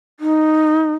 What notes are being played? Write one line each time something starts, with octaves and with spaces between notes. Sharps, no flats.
D#4